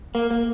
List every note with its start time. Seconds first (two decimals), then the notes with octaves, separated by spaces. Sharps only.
0.15 A#3
0.31 A#3